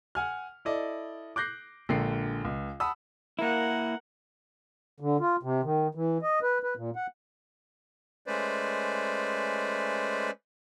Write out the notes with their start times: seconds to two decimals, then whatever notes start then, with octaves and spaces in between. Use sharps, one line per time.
0.15 F#5 G#5 F6
0.65 E4 A4 D5 D#5
1.36 D6 F#6 G6 A#6 C7
1.89 A#1 D3 G#3 A#4 G5 C7
2.45 C#2
2.80 F#5 A5 B5 D#6 E6
3.39 A#3 E4 A#4 F#5
5.00 D3
5.20 F4
5.43 C3
5.63 D#3
5.95 E3
6.22 D#5
6.43 B4
6.63 B4
6.77 A#2
6.96 F#5
8.26 G#3 A3 C#4 B4 C5 D5